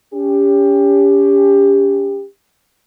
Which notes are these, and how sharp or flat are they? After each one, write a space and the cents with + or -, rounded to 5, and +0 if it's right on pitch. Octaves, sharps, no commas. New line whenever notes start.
C#4 +30 G4 +20